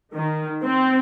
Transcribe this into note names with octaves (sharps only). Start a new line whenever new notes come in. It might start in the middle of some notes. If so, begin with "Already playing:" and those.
D#3
C4